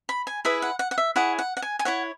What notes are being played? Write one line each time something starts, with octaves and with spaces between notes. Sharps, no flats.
B5
G#5
E4 G#4 B4 E5
F#5
F#5
F#5
E5
E4 G#4 C#5 F#5
F#5
F#5
G#5
G#5
E4 C#5 F#5